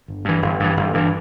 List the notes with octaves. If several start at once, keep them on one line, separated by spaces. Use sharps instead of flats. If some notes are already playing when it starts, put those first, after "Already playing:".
G1
G2 E3
G1
G2 E3
G1
G2 E3